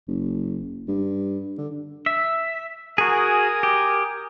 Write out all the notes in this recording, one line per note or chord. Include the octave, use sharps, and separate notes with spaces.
F#1
G2
D3
E5
F#4 G#4 A#4 G#5 D#6
G4